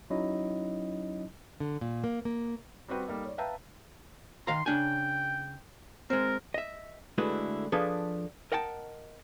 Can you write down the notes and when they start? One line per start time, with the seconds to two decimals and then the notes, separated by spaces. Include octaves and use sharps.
0.10 F#3 C#4 D#4 E4 D#5
1.60 D3
1.81 A#2
2.04 A#3
2.25 A#3
2.88 G3 C4 F#4 B4 G5
3.07 G3 A#3 D#4 A4
3.24 C#5 D5
3.38 B4 E5 F5 G5 A5 A#5
4.47 D#3 F5 A#5 C6
4.66 C#3 D4 G5 G#5
6.10 G#3 C4 A#4
6.54 D#5 E5
7.18 D3 G#3 A3 E4 F#4 B4
7.72 F3 D4 G#4 A4 B4
8.52 A#4 D#5 F#5 G5 A5